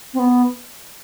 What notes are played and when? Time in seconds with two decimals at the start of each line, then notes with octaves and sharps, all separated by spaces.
0.14 C4
0.19 B3